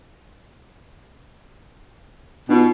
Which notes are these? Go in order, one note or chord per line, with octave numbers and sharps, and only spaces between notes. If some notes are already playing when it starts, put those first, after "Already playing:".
B2 D4 D#4 F4